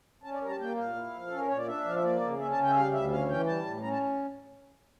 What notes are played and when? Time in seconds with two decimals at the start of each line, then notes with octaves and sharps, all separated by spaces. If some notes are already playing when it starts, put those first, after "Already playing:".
0.23 C#4 A5
0.33 D5
0.42 G3 A#4 A#5
0.50 A5
0.60 A#3 G5
0.77 A#2 F5
0.96 E4
1.13 F3
1.27 C#4 A4
1.37 A#4
1.47 A#2 C#5
1.57 D5
1.67 D4 E5
1.85 F3 F5
1.95 E5
2.03 A#3 D5
2.21 C#3
2.39 C#4 E5
2.51 A5
2.57 C#3
2.63 G5
2.69 E5
2.74 G3 F5
2.92 D2 E5
3.11 C#4 F5
3.29 E3 G5
3.47 G3 A5
3.65 A2
3.82 C#4 A#5
3.92 A5